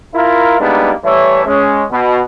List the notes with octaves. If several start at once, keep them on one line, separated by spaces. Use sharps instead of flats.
E4 F4 A#4
G3 G#3 A#3 B3 D4 D#4
E3 G3 A3 C#5 E5
G#3 C#4
B2